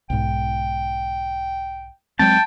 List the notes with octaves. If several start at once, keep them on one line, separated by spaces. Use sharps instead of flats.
B1 G#2 G5
F#3 G#3 C4 G5 A5